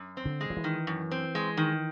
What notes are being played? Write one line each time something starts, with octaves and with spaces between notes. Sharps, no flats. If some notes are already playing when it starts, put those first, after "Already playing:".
Already playing: F#2
C4
D3
G#3
F3
E3
D#3
F#2
C4
G#3
D#3